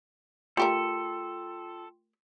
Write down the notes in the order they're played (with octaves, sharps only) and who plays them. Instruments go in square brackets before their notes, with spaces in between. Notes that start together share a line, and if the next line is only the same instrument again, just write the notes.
[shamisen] A3 G4 A#4 [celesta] F4 G5 C6 [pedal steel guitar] A4